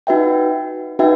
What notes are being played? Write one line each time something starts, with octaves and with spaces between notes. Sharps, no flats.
D#4 F#4 B4 E5 G5
D#4 F#4 B4 E5 G5